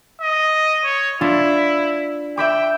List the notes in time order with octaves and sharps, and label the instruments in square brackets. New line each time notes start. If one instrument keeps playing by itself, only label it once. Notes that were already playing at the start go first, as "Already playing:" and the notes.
[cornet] D#5
C#5
[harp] D4 F4 [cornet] E4
[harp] E5 B5 D6 [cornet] G5